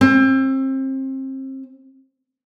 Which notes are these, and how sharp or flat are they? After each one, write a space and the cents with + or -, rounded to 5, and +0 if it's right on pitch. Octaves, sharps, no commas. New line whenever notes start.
C4 +30